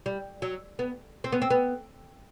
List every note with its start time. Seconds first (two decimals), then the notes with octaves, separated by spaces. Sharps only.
0.06 G3
0.42 F#3
0.79 B3
1.24 C4
1.32 B3
1.42 C4
1.50 B3